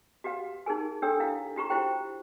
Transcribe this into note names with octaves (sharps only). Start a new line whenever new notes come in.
F#4 G4 B4 F5
D#4 G#4 A#4 G#5
D4 G4 A4 C#5 G5 E6
E4 F5
F4 G4 A#5 C#6
E4 F#4 C5 G5